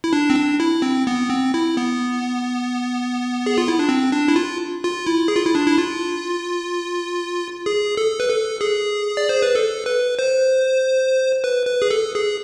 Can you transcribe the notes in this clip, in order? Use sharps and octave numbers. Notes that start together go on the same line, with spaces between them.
E4
D4
C4
D4
E4
C4
B3
C4
E4
B3
G#4
F4
E4
D4
C4
D4
E4
F4
F4
E4
G#4
F4
E4
D4
E4
F4
G#4
A4
B4
A4
G#4
D5
C5
B4
A4
B4
C5
B4
B4
G#4
A4
G#4